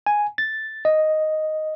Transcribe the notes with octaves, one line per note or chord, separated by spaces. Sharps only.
G#5
A6
D#5